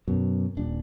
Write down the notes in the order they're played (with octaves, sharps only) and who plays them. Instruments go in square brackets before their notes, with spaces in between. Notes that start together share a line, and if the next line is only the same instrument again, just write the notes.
[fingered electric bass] F#2 B2
D#1 D4